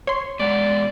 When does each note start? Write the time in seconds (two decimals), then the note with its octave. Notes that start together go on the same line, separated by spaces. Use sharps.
0.07 C#5 C6
0.39 B2 G#3 D5 F#5